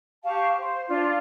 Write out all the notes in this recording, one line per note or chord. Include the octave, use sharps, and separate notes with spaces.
G4 F5 A5 C#6
C5
D4 F4